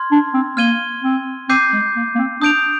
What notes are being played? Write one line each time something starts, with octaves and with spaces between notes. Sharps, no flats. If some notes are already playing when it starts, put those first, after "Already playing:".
Already playing: C6 F6 G#6
D4
C4
A#3 F6 G#6 D#7 G7
C4
C4 D6 G6 C7 D#7
G#3
A#3
A#3
C4
D4 D#6 G6 D7 F7